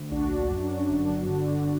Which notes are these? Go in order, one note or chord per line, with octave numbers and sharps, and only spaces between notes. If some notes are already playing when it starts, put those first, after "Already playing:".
Already playing: D2
A#1 D4 F#4
A#1
F#2
F#2
G1
G1
D3
D3